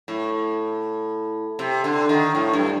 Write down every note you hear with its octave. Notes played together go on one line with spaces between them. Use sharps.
A2
C3
D3
D#3
A2
G2